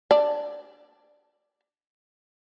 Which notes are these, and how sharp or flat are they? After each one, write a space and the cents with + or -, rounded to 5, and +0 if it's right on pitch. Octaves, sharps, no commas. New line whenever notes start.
D4 +0 D5 +0